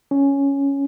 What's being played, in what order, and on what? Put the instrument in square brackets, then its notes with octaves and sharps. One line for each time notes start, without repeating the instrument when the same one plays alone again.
[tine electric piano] C#4